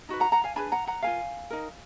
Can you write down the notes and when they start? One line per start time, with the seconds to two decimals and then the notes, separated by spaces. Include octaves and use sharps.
0.09 D#4 F#4 B4
0.20 F#5 A#5
0.32 F#5 A#5
0.44 F5 G#5
0.56 D4 G#4 B4 G#5 B5
0.72 F#5 A#5
0.87 F#5 A#5
1.02 F4 A#4 F5 G#5
1.50 D#4 A#4